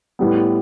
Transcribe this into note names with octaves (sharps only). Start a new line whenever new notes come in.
A2 G3 B3